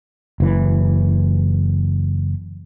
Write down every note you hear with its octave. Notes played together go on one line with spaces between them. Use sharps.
F#1 E3